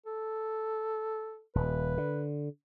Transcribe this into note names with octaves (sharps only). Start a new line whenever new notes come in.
A4
D#1 B4
D3